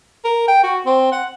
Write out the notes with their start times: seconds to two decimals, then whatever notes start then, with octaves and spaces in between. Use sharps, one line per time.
0.24 A#4
0.48 G5
0.63 F#4
0.86 C4
1.12 F#5